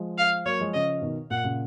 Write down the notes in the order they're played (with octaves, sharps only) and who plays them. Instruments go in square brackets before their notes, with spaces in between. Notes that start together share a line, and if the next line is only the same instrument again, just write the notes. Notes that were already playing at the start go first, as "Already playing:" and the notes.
Already playing: [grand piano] F3 G#3
[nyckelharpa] F5
[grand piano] F#3 A#3 [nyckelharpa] C#5
[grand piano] F3 G#3
[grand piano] C#3 F3 [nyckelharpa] D#5
[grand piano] B2 D#3
[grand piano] A#2 [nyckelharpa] F#5
[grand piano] A#2 C#3